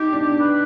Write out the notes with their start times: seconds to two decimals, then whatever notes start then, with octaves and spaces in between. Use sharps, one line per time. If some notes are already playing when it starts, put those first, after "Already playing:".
Already playing: D#4 G4
0.13 D4
0.40 B4